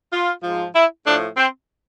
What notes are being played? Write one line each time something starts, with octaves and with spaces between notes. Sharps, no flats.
F4
G#2 F3
E4
A2 F3 D4
C4